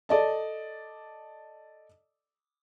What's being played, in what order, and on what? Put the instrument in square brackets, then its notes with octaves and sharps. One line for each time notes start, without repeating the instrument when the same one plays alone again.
[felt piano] A4 D5 D#5 A5